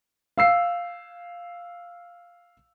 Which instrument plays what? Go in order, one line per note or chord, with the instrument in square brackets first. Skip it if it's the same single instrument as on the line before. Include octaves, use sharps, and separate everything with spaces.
[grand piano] F5 E6 C7